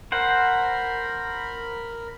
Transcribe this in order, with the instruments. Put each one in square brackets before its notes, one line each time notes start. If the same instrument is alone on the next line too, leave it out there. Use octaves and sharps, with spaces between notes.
[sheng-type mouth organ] A#4 B5 [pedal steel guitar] C5 F#5